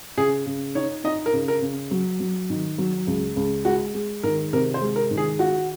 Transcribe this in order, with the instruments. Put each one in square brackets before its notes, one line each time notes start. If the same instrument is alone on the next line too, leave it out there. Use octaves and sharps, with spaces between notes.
[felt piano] C#3 [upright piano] G#4
[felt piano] C#3
[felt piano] D#4 [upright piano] C#5
[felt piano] D#4 [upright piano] D#5
[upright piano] A#4
[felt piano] C#3
[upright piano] A#4
[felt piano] C#3
F#3
F#3
D#3
F#3
C#2
C#2
[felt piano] G#3 [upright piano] F#4
[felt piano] G#3
[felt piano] D#3 [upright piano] A#4
[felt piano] C3 [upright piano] A#4
[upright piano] C5
[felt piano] G#3
[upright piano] A#4
[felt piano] D#3
[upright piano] G#4
[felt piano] F4 [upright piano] F#4